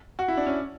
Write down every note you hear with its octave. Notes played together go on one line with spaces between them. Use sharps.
F#4
E4
D4
C#4